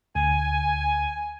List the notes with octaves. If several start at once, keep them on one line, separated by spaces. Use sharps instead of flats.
D2 G#5